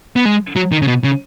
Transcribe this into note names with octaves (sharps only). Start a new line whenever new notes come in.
B3
G#3
F#3
D#3
C#3
B2
C#3